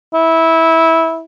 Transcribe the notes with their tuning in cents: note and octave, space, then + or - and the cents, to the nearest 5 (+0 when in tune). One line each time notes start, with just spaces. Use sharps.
E4 -15